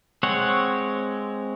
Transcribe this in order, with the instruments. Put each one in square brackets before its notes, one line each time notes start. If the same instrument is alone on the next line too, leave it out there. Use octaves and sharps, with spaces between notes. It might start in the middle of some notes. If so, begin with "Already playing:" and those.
[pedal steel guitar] G#3 C4 C#5 F#5